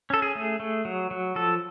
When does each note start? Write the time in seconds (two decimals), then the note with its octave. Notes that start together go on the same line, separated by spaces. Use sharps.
0.10 C#4 A4
0.22 G#4
0.35 A3
0.60 A3
0.85 F#3
1.11 F#3
1.36 F3 A4